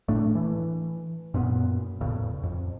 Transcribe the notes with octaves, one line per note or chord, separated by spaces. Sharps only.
A2 A3 D4
E3
F#2 A#2 B3
E2 A2 C#3
F2